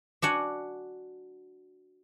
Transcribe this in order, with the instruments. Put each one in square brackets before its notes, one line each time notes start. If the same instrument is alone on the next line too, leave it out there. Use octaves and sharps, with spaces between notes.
[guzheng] D4 F#4 F#5 G#5